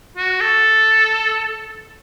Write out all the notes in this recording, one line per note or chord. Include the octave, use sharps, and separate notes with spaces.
F#4
A4